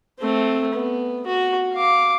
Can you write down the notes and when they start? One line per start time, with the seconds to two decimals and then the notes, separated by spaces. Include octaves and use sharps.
0.18 A3 C4
0.73 B3
1.26 F#4
1.73 F5 D6